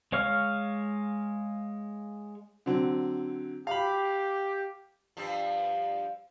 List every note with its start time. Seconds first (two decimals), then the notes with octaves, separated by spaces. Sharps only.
0.12 G#3 C#5 F5 C#6 F6
2.66 D3 F#3 C4
3.67 G4 F5 B5
5.17 G2 F3